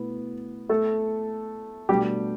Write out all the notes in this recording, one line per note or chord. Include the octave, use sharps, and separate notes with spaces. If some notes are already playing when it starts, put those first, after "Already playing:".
Already playing: B2 A3 B3 E4
A3 A4
B2 G3 A3 D4 F#4 G4